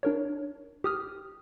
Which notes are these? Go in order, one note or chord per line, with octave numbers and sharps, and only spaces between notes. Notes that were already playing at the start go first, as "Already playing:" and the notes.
D4 A#4 C#5
G4 D#6 F6